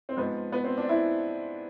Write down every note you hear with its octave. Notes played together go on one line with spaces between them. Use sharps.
C4
G#2 F3 B3
B3
C4
D4
E4